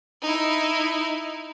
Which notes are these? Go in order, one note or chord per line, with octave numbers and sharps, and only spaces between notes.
D#4 E4